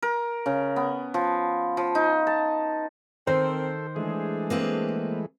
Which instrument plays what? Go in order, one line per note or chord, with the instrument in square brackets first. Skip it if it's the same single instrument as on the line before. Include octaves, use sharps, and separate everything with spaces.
[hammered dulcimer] A#4
C#3
B3
F3
F3
D#4
A5
[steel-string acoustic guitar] D#3 [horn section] C4 A#4 [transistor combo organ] A4 [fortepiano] C5
[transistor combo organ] E3 G#3 A3 [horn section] D4 G#4
[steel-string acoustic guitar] A#3 C4 B4